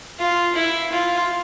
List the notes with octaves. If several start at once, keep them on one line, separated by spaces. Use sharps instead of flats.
F4
E4
F4